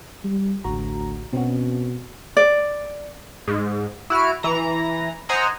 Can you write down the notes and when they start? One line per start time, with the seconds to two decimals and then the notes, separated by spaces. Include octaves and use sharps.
0.24 G3
0.64 A1 D2 F#4 A#5
1.33 B2 C4 C#4 F#4
2.37 D5
3.47 G#2
4.10 E4 F#4 F6 D7
4.43 E3 A#5
5.29 C5 D#5 F#5 G#5 A#5 E6